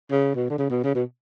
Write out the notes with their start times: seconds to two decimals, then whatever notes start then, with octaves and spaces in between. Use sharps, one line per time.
0.11 C#3
0.35 B2
0.50 D3
0.58 C#3
0.70 B2
0.84 C#3
0.95 B2